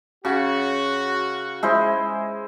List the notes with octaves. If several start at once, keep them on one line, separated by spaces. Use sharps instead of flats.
C#3 F#4
G#3 E4 C5